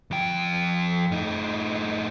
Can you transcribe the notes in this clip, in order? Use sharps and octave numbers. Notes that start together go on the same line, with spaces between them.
F2 G5
A2 D#4